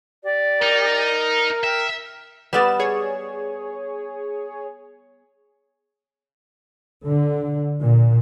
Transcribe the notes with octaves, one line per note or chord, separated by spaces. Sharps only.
G4 D5
D#4 A#4
E5 G5 F6
G3 B3 B4 D5 D#6 E7
G#4 C#5
D3
A#2